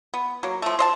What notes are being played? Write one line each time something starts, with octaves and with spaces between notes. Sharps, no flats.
B3
F#3 A#3
F3 A3
C5 D#5 A5